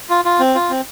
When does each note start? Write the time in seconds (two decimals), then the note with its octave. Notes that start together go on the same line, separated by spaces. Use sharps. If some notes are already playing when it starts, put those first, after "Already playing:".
0.10 F4
0.25 F4
0.40 C4
0.55 F4
0.70 C4